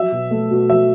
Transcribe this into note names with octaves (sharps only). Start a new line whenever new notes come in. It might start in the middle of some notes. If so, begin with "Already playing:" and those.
Already playing: F#3 E5
B2
A3
B2
F#3 E5